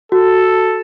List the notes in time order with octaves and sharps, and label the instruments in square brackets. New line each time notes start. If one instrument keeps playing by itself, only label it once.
[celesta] F#4 [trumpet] A4